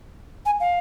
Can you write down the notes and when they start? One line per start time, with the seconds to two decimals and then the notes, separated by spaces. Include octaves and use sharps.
0.46 G#5
0.60 F5